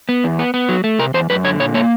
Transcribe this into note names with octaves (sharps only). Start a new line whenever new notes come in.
B3
E2
B3
B3
F#3
A3
C3 A#4
E2 C5
F#2 B4
D3 C#5
A#2 C#5
A#3 C#5